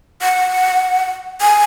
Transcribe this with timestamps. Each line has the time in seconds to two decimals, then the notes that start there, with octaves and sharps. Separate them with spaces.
0.22 F#5
1.41 G#5